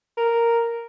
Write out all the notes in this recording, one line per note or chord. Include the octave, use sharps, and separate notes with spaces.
A#4